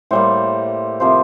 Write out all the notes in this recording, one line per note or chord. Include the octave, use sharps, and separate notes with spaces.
A2 G3 A#3 C5
C3 F3 A#3 C5